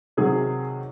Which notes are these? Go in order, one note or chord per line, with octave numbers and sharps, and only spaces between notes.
C3 D#3 F#3 G#4